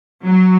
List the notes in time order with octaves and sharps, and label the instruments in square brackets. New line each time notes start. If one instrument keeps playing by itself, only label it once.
[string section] F#3